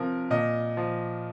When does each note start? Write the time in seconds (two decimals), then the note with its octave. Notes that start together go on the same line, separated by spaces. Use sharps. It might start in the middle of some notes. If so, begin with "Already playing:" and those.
Already playing: C3 F3 A#4
0.30 A#2 D#5
0.77 F3